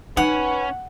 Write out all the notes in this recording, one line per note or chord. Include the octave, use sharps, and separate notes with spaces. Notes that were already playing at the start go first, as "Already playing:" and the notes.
C#4 D#4 B4 F#5